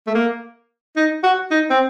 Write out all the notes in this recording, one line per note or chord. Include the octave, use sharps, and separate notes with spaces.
A3
A#3
D#4
F#4
D#4
C4